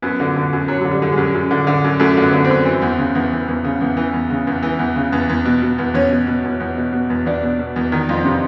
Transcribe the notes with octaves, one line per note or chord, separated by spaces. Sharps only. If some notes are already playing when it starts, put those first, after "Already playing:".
F#2 B3
D3
D3
F#2
F#2 F#3
D3 F#3
G3
D3
G#3
F#2
F#2
D3
D3
F#2
F#2 A3
D3
B3
D3
C4
F#2
E3
E2
C#3
E2
E3
E2
C#3
E2
E3
E2
C#3
E2
E3
E2
C#3
E2
E2
B2
B2
E2
E2 C#4
B2
B2
E2
E2
B2
B2
E2
E2 D4
B2
B2
E2
D#3
F2
C3